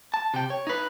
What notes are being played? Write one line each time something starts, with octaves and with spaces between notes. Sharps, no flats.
A5
C3 G5
C#5
D#4 B4